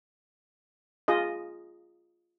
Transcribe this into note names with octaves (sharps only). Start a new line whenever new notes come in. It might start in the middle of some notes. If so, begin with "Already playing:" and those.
F4 G#4 D#5